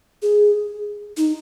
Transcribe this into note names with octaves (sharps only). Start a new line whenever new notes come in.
G#4
D#4